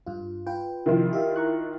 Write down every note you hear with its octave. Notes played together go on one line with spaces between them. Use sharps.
G2 F4
F4 B4 G5
C3 D#3 F3 E4 F4
G4 E5 F5
A#5 C#6 F#6